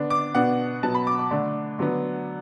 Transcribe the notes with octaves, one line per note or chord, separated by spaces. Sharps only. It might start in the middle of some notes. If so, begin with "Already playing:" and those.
Already playing: D3 B3 D4
D6
B2 B3 D4 F#5
B2 F#3 B3 A5
B5
D6
D6
D3 A3 D4
D3 F#3 B3